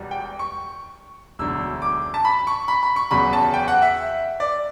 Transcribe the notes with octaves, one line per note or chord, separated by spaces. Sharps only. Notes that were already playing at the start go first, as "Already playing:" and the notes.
Already playing: E1 E2 B2 G3
G5
C#6
E1 D2 D3 F#3 E6
D6
A5
B5
C#6
B5
B5
C#6
E2 C#3 F#3 B5
A5
G5
F#5
E5
D5